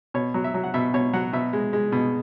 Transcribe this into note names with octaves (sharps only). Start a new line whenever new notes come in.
B2 C#5
F#3
E5
F#3
F#5
B2 E5
B2 C#5
F#3 F#5
B2 E5
G#3
G#3
B2